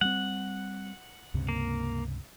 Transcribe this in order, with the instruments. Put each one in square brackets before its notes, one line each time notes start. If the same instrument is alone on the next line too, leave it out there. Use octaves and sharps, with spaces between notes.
[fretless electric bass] G3 G#3 C4 [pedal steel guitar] F#5
[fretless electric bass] C#2 G2 C3
[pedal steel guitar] A#3